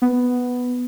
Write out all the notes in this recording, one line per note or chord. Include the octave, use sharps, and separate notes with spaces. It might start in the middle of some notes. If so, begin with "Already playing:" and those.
B3